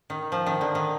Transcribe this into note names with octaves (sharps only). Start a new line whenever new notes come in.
D#3
F3
D#3
D3
D#3